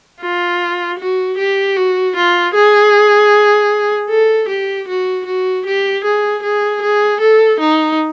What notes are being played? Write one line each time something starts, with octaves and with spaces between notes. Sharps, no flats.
F4
F#4
G4
F#4
F4
G#4
A4
G4
F#4
F#4
G4
G#4
G#4
G#4
A4
D#4